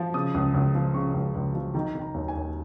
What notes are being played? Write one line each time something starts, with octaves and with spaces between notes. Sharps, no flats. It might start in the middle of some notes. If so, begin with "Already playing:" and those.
Already playing: F3
C#3 D#6
C#2
C#2
F3
C#3 C#6
C#2
C#2
F3
D#3 A#5
D#3
A#5
D#2
G#5
D#2